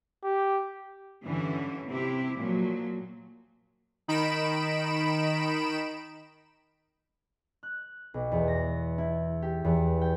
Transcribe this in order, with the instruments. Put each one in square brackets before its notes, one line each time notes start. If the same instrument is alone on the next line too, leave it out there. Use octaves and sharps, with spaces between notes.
[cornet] G4
[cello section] G2 D3 E3 C#4 E4
C3 C4 E4 G4
A#2 F3 F#3
[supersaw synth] D#3 D#4 B5 D7 E7
[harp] F#6
B1
E2
A#6
E4
G4
E2
G5